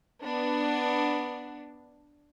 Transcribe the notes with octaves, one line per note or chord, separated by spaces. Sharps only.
B3 D4